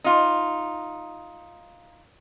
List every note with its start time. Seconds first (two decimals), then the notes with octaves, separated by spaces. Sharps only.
0.04 D#4 F4